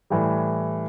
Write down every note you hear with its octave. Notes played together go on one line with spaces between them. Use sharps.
A2 E3 G3